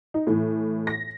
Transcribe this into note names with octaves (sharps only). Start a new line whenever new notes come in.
D#4
A2 E3
A#6